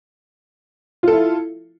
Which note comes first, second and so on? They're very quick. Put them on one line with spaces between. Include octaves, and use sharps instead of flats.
F4 A4 E4